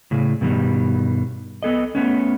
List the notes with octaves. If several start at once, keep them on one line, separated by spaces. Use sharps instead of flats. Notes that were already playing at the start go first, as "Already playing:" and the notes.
A2 C#3
G2 B2 D#3 G3
B3 A4 D#5
A3 B3 C#4